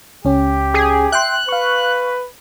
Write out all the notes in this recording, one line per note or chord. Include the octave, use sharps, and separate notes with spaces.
C#2 C#4 G4
G#4
E5 G5 C6 F#6
B4 F5 C#6